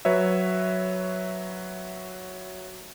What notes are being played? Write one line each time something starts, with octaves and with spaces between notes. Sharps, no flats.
F#3 B4 C#5 E5